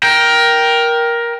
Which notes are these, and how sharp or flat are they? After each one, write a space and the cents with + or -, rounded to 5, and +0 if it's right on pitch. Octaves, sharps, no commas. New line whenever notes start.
A#4 +15 G5 +0